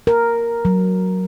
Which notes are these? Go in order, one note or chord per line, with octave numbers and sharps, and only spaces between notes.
A#4
F#3